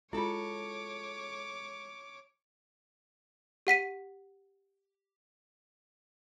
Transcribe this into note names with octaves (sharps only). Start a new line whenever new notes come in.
G#3 E4 F4 A4 C#5 D6
G4 F#5 B6 D#7